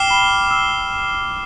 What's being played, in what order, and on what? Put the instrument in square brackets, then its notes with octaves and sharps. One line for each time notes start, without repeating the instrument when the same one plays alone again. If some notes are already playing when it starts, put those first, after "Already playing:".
Already playing: [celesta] G5 [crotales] D6 F6 C7 E7 G7
[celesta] B5
E6